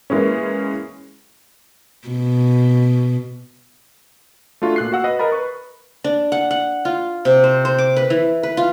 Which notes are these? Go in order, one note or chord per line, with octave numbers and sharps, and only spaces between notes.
E3 G#3 A#3 C#4
B2
A3 D4 F4 F#4
A#2 F#6 C7
F#4 F5 F#5 E6
B4 D#5
A#4 D#5 B5 A6
B4 C#6
D4
F#5
F#5
F4
C3
C5
C5
D6
B4
E3
B4
F4